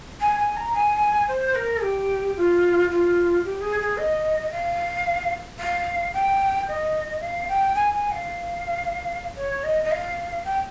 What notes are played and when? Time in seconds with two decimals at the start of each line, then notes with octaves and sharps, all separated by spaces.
0.21 G#5
0.39 G#5
0.57 A#5
0.75 G#5
1.28 C5
1.55 A#4
1.82 G4
2.37 F4
2.91 F4
3.44 G4
3.61 G#4
3.80 G#4
3.98 D#5
4.51 F5
5.59 F5
6.14 G5
6.68 D#5
7.21 F5
7.49 G5
7.75 G#5
7.93 G#5
8.11 F5
9.37 C#5
9.64 D#5
9.84 D#5
9.92 F5
10.45 G5